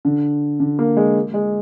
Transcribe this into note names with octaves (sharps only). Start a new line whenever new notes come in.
D3
D3
A#3
G#3
G#3